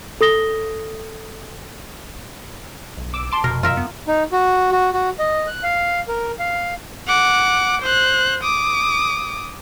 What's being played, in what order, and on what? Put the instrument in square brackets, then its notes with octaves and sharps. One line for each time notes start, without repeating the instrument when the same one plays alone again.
[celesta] A4 D#6 A#6 G7
[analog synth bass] B1
[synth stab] D6 E6
A5 C6 D6
[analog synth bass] F1 [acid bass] B2 [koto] A#4
[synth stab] F#2 [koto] F4 A#4 E5
[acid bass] B3
[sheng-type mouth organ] D#4
F#4
F#4
F#4
D#5
F#6
F5
A#4
F5
[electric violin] F#5 D6
C5 F#6
D6 D#6